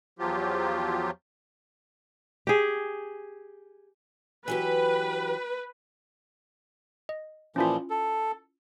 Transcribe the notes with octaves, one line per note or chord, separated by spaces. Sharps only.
E2 F3 F#3 F4 G4
G4 G#4
E3 F#3 G4 B4
D#5
A#2 E3 F3 C#4 E4 F4
A4